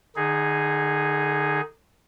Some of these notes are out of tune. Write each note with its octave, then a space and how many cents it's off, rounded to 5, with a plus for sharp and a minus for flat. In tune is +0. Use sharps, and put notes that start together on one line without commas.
D3 +35 D#4 +0 G#4 +0